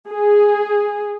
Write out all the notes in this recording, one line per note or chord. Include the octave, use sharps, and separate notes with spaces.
G#4